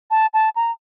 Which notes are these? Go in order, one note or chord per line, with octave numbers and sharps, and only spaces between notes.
A5
A5
A#5